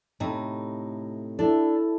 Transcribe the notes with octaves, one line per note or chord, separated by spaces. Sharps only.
A2 C3 D#4
D4 E4 A4